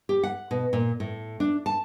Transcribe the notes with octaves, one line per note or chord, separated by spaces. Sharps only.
G4
F#5
B2
A#2
A2
D4
A5